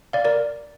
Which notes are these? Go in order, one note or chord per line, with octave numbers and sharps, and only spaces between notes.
D5 F5
A#4 D5